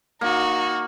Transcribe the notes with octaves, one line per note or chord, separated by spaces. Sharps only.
A#3 D#4 F#4